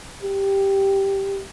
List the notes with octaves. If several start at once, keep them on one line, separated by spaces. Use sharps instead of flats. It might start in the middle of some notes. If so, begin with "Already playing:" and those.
G4